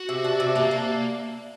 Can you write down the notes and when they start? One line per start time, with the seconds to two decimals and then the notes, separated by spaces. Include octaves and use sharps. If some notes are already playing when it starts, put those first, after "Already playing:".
Already playing: F#4
0.09 C3
0.24 D4
0.40 C3
0.56 A#3 D4
0.71 D4